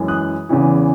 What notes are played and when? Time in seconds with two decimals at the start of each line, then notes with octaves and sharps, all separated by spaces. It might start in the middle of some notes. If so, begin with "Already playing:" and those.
Already playing: F#2 E3 G#3
0.08 D#6 F#6
0.49 E2 C#3 E3